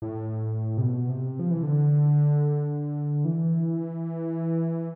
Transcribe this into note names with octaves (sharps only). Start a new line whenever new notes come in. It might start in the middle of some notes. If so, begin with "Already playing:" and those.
A2
C3
B2
C3
F3
E3
D3
E3